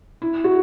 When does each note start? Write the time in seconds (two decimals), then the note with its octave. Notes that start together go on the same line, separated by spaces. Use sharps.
0.22 E4
0.44 F#4